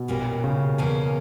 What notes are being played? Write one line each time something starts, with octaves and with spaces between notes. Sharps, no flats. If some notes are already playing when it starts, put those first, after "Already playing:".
Already playing: B2
A#2 G3 A#3 C#4
C#3
E2 B2 A#3 C#4